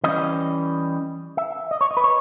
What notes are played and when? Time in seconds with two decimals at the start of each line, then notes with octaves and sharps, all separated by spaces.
0.04 E3 G3 C#4 D#5
1.37 E5
1.71 D#5
1.81 C#5
1.91 D#5
1.97 B4
2.04 C#5